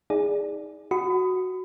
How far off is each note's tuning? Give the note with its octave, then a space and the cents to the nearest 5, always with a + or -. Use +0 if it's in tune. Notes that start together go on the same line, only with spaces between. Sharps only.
D#4 +25 G#4 -10 D5 +0
F#4 +0 B5 +30 D#6 +0